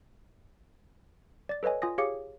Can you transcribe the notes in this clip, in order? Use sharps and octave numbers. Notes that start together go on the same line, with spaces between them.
D5 A6
A4 B4 C#5 D#5 G#5
F4 G#5 D#6 A#6
G4 G#4 C#5 F5 D6 C#7